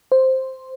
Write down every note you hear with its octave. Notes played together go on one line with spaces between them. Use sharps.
C5